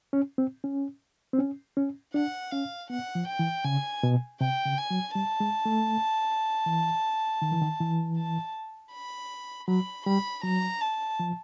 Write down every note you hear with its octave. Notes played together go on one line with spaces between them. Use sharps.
C#4
C4
C#4
C4
C#4
C#4
D4 F#5
C#4 F5
B3 F#5
F3
G5
E3
C#3 G#5
B2
C3 G5
C#3
G#5
F#3
G3 A5
G#3
A3
E3
D#3
E3
D#3
E3
A5
B5
F#3 B5
G3 B5
F#3 A#5
A5
F3